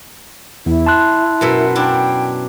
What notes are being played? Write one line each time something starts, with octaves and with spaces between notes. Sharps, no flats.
E2 E4
A5 C6 F#6
F#2 B2 E5
D4 E4 G5